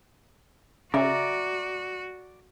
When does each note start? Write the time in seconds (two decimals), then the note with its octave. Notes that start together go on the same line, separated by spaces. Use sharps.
0.94 C#3 F#4 A4 B4 D5 E5 A#5